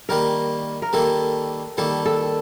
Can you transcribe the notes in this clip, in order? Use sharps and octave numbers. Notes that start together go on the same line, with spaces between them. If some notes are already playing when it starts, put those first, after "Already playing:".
D#3 G3 A#3 A#4
A#4
D#3 G3 A#3 A4
D#3 G3 A#3 A4
A4